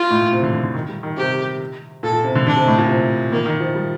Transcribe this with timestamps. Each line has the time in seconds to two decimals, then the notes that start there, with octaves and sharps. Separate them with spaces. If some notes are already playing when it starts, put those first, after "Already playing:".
Already playing: F4
0.11 A2
0.21 A#2
0.32 C3
0.43 D3
0.53 D3
0.63 D3
0.74 D#3
0.89 G3
1.03 D#3
1.17 C3 G4
2.03 A#2 A4
2.13 A#2
2.24 C3
2.35 D3
2.46 D3 D4
2.57 C3
2.67 A2
2.78 A#2
2.89 C3
3.32 D#3 A#3
3.46 D#3
3.60 F3
3.75 G3